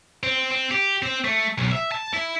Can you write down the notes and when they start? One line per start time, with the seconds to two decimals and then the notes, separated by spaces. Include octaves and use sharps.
0.23 C4
0.52 C4
0.71 G4
1.02 C4
1.25 A3
1.58 B1
1.72 E5
1.92 A5
2.14 E4